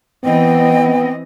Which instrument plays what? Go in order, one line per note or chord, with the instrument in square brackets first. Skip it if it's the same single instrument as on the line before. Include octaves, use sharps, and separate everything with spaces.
[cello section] E3 C4 D#5 [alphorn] B3 [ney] G5